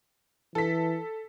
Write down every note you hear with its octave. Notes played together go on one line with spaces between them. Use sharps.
E3 A4 B6